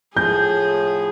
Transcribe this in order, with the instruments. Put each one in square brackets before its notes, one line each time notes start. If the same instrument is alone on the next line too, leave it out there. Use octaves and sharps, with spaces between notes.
[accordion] A2 F3 [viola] G#4 [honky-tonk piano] G6